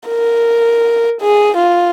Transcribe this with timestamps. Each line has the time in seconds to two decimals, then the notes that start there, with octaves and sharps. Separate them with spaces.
0.08 A#4
1.21 G#4
1.57 F4